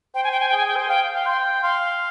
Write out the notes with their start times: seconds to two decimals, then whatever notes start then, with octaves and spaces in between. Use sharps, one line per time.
0.15 C5 G5
0.24 G#5
0.32 G5
0.40 G#5
0.49 G#4 G5
0.57 G#5
0.65 G#4 G5
0.76 C5
0.89 F5 G5
1.14 F5
1.26 G5 C6
1.63 F5 C6